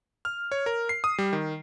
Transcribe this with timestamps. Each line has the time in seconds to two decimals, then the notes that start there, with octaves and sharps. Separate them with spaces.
0.25 F6
0.52 C#5
0.66 A#4
0.89 C7
1.04 D#6
1.18 G3
1.33 D#3